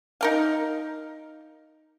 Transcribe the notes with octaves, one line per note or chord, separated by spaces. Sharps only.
D#4 A#4 F5